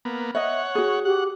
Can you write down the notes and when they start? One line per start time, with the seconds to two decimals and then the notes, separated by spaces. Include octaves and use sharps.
0.05 A#3 B3
0.35 C#5 D#5 E5 F#5
0.75 F#4 G#4
1.05 G4 F#5